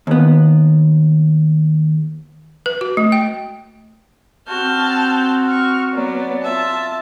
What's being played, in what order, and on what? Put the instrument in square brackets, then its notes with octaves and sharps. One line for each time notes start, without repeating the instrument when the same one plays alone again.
[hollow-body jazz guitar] D#2 B3
[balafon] B4
F#4
A3
G5
[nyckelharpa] C4 F#4 [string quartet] A5 F6 G6
[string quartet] C#6 F6
F#3 B3 D5
[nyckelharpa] F4 E5 [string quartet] A5